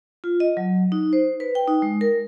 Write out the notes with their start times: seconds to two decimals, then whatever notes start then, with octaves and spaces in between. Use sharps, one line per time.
0.24 F4
0.40 D#5
0.57 F#3
0.92 D#4
1.13 C5
1.40 B4
1.55 G5
1.68 D#4
1.82 G#3
2.01 A#4